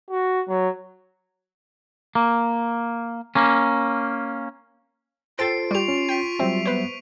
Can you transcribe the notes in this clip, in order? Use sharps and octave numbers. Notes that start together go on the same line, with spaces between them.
F#4
F#3
A#3
A#3 C#4
F4 A4 C5 G5 E6 A6 C7 D7
G3 G4 C#6 F7
C#4
G5 B6 D7 D#7
F#3 G3 C4 E5
B3 B4 C5